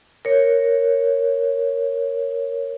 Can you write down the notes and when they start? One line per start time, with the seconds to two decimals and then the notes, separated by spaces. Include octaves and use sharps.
0.25 A#4 C#5